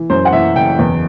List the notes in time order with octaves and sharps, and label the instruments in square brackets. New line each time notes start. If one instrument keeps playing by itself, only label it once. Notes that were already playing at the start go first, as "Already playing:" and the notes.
Already playing: [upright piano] E3
F#2 C5
F#5
E3 E5
F#1 G5
E2